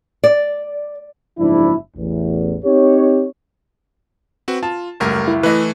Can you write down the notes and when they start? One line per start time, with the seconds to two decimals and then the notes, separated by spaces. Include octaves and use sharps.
0.24 D5
1.39 F#1 G#2 F3 D4 E4
1.97 A1 E2
2.65 C4 D#4 G4 C#5
4.48 C4 F#4 B4
4.63 F4 A5
5.00 C#2 F#2 G3 A3 A#4
5.28 E4
5.43 E3 A3 B4 D#5